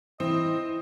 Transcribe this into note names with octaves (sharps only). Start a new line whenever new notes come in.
E3 C4 E4 D#5